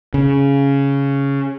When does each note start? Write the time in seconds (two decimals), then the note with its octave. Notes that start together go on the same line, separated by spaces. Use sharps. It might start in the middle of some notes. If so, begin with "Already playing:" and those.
0.14 C#3